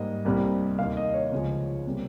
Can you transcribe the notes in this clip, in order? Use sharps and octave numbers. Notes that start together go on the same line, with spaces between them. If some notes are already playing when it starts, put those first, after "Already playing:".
Already playing: G#2 G3 A#3 D#5
C2 C3 G3 A#3
D#2 D#3 A#3 F5
D#5
C#5
C#2 C#3 F3 G#3
C3 G3 A#3